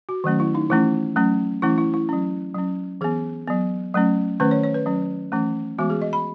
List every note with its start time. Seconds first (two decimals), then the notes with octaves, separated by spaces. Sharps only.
0.09 F#4
0.24 D#3 F#3 A3 C#4
0.40 E4
0.55 D#4
0.70 E3 A3 C#4 E4
1.16 F#3 A3 C#4
1.62 E3 A3 C#4 E4
1.78 E4
1.94 E4
2.09 F#3 C#4
2.55 F#3 C#4
3.01 E3 B3 G#4
3.47 F#3 B3
3.94 F#3 A3 C#4
4.40 D#3 A3 C#4 B4
4.51 C#5
4.64 C#5
4.74 B4
4.86 F#3 C#4
5.32 E3 A3 C#4
5.78 E3 G#3 B3 F#4
5.90 G#4
6.02 D#5
6.13 B5